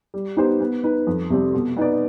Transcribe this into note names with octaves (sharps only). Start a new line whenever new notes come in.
G3
B3 D#4 G4 C5
B3
D#4 B4
F2
C3 G3 C4
B2
B3 D#4 B4 D5